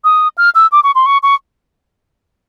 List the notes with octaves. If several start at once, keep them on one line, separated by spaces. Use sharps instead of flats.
D#6
F6
E6
D6
C#6
C6
C#6
C#6